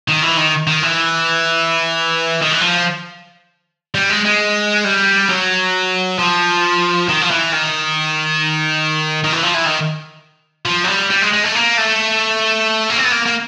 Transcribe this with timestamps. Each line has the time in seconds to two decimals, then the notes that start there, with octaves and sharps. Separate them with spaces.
0.08 D#3
0.22 E3
0.37 D#3
0.67 D#3
0.83 E3
2.42 D#3
2.51 E3
2.61 F3
3.95 G3
4.10 G#3
4.25 G#3
4.85 G3
5.29 F#3
6.19 F3
7.09 D#3
7.21 F3
7.31 E3
7.53 D#3
9.24 D#3
9.32 E3
9.43 F3
9.54 E3
9.66 D#3
10.66 F3
10.84 F#3
10.88 G3
11.10 G3
11.22 G#3
11.33 G#3
11.44 A3
11.55 A#3
11.78 A3
12.90 A#3
12.98 C4
13.05 B3
13.12 A#3
13.26 A#3